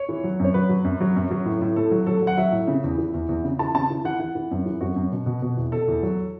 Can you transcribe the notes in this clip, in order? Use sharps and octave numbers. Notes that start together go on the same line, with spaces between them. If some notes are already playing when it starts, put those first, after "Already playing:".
Already playing: C#5
E3
F#3
F#2 C#5
F#3 B4
F#3
F#2
F#3
F#2
F#3
A2
A2
A2 A4
F#3
F#3 A4
F#3
F#5
F#3 E5
A2
C#3
E2
E3
E2
E2
C#3
E3 A5
C#3 A5
E3
E3 F#5
E3 F#5
E3
F#2
E3
F#2 F#4
F#2
B2
B2
B2
E2
B2 A4
E2
F#3